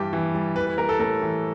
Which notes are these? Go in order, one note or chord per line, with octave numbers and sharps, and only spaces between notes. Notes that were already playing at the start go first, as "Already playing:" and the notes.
Already playing: G2 E3 G3 G4
E3
G3
E3 B4
B4
G3 A#4
A4
A2 A#4
E3